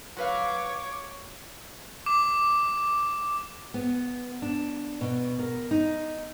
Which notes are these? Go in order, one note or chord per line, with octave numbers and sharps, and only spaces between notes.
F#3 B4 C#5 F5 D6
D6
B3
D4
B2
A#4
D#4